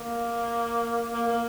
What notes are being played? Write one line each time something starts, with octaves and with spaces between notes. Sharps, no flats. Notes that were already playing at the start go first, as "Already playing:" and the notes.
Already playing: A#3
A#3
A#3